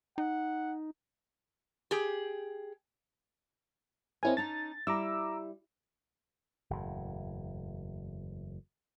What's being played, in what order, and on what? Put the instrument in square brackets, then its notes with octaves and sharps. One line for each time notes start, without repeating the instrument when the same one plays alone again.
[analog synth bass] D#4 [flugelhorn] F#5
[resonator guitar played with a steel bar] G4 G#4
[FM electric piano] C4 E4 G#5 [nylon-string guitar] A#4 C#5 D#5
[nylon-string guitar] C#4 D#4 A5 [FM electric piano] A6
[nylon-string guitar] G3 E4 [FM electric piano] A#5 D6 E6
[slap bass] F#1 E2 A2